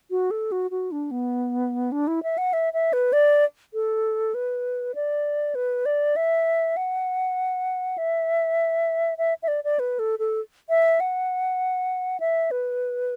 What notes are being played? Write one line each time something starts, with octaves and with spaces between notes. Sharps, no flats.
F#4
A4
F#4
F#4
D4
B3
D4
E4
E5
F#5
E5
E5
B4
D5
A4
B4
D5
B4
D5
E5
F#5
E5
E5
E5
D5
D5
B4
A4
A4
E5
F#5
E5
B4